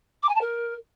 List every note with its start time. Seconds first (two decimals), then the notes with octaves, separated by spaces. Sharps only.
0.23 D6
0.29 G#5
0.35 A5
0.41 A#4